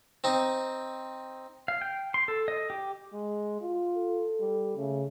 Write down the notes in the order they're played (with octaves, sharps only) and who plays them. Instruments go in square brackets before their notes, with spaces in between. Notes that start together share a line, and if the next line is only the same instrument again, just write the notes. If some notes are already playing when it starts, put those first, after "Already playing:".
[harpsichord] C4 D#4
[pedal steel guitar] F5
G5
C6
A4
D#5
G4
[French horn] G#3
F4
[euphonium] A4
[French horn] G3
[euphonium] C#3 [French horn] A3